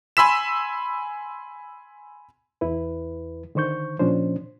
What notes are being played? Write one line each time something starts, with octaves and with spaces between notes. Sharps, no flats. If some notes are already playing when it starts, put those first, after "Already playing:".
G#5 B5 C6 E6 B6 E7
E2 E4 B4
D3 D#3 C5 C#6 G6
A#2 F3 C#4 D4 C5